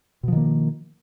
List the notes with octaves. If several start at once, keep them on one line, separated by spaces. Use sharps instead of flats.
B2 D#3 F3 A#3